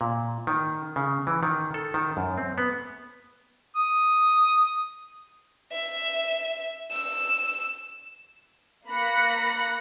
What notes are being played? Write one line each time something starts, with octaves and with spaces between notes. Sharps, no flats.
A#2
D#3
C#3
E3
D#3
A4
D#3
F#2
C4
B3
D#6
E5
E6
A#3 B5 F#6 A#6 C#7